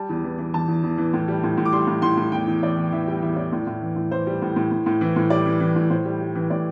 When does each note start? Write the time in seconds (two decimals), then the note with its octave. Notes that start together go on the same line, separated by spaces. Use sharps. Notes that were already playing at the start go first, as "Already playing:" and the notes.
Already playing: G3 A5
0.09 E2
0.24 E3
0.39 E3
0.54 E2 A5
0.68 E2
0.83 E2
0.98 E3
1.13 A2
1.28 G3
1.43 A2
1.58 A2
1.65 D6
1.72 G3 C6
1.87 A2
2.02 A2 C6
2.17 A2
2.32 E2 G5
2.47 E2
2.63 E3 D5
2.77 E3
2.92 E3 E5
3.08 G3 G5
3.22 E2 E5
3.36 E2 D5
3.52 A2
3.67 A2
3.82 E3
3.96 A2
4.11 E3 C5
4.27 G3
4.42 A2
4.56 A2
4.71 A2
4.86 A2
5.01 E3
5.16 A2
5.30 G3 D5
5.46 E3
5.60 E3
5.76 A2
5.90 A2 C5
6.05 G3
6.21 G3
6.35 E3
6.50 A2 D5